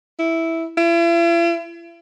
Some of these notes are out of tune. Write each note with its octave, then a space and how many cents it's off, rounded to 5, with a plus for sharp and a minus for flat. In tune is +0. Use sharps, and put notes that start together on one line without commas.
E4 -5
E4 +45